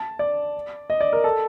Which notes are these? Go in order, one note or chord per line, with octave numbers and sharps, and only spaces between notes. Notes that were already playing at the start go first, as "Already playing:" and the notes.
Already playing: A5
D5
D#5
D5
A#4
A4